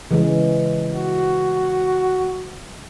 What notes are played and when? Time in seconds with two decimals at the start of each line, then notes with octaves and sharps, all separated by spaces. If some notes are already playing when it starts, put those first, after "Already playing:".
0.11 C#3 E3 G#3
0.93 F#4